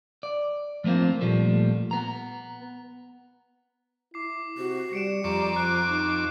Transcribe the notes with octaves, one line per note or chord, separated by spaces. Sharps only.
D5
F3 A3 A#3 C4 F4
A#2 F3 G3 A3
B3 A#5
E4 D6 C7
C3 F#4
G3 C#7 D7 E7
F2 G3 A#5 C#6 D6
F3 F#6
D#4